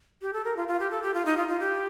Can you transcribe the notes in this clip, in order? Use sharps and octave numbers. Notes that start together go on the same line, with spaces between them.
G4
A4
A#4
F4
F4
G4
A4
G4
F4
D#4
F4
F4
G4